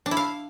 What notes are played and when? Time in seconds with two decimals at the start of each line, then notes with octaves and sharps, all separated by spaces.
0.06 D4
0.11 E4
0.17 F5